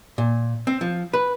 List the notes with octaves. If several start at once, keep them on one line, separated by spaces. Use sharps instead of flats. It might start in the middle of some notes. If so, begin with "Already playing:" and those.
A#2
C4
F3
B4